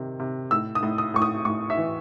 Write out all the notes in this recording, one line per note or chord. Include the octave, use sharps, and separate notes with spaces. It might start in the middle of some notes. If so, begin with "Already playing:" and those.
Already playing: C3 D#3
C3
A2 E6
D#6
A2
D#6
A2 C#6
D#6
A2 C#6
E5
E3